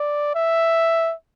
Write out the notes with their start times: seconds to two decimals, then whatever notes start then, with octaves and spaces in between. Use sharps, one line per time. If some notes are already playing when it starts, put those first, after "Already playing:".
Already playing: D5
0.35 E5